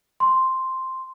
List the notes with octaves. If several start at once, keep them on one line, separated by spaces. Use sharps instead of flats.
C6